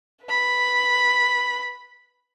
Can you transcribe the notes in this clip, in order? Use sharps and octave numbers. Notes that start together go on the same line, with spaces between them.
B4 B5